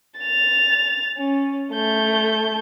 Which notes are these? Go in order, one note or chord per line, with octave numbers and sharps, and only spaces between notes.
A6 F7
C#4
A3 G6